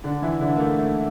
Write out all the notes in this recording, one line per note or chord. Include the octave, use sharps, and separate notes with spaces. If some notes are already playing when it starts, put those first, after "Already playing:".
D3 D4
E3 E4
D3 D4
A#3
A3
A3